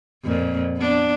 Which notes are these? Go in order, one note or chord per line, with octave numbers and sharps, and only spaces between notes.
F2 A#2
B3 D4